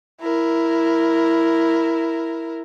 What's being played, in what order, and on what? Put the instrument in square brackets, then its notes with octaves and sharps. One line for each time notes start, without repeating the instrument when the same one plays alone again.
[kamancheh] E4 A#4